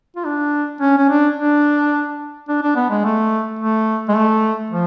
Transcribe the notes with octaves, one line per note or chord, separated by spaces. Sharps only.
F4
D4
C#4
C#4
D4
D4
D4
D4
B3
G#3
A3
A3
G#3
A3
F3